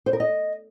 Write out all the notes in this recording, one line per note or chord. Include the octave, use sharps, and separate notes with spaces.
C5
A#4
D#5